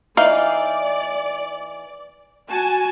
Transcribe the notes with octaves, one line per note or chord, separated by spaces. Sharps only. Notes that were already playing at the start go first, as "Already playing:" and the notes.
E3 D#4 D5 F5
F#4 G#5 A5